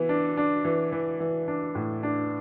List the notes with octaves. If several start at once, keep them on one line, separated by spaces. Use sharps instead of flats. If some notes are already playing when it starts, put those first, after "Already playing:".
Already playing: E3 B3
D4
D4
E3
E3
E3
D4
A2
D4